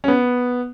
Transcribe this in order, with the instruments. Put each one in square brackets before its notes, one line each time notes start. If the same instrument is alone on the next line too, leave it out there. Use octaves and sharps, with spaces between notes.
[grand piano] C#4
B3